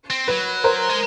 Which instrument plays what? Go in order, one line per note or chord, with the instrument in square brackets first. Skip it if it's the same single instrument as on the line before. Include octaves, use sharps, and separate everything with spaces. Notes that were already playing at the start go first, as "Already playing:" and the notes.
[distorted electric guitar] C4
[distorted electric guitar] F#3 [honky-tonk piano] B4
[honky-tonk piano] A#4 C5
[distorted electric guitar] G#3